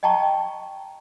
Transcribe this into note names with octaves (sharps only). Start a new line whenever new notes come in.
D#5 G5 A5 A#5 C#6